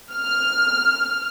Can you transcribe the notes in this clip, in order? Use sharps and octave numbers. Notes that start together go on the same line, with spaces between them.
F6